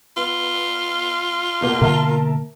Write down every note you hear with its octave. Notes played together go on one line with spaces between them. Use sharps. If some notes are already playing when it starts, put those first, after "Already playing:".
B3 F4
E2 B2 A#3
B2 D3 A#3 A#4 E5 A5